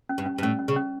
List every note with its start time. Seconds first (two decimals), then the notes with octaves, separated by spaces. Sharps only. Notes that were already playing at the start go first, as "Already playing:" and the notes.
0.09 C#4
0.18 G2
0.26 C#4
0.38 G2
0.43 A2 C#4
0.59 C#4
0.68 C#3
0.76 C#4